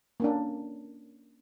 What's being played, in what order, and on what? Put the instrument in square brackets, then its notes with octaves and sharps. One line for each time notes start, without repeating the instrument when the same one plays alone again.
[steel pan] A#3 C#4 D4